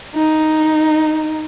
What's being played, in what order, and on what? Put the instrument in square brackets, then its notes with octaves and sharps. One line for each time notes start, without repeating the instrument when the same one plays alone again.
[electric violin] D#4